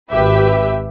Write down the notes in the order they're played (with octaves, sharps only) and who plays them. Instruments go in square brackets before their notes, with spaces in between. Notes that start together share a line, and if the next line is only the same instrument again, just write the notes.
[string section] G#1 G4 B4 E5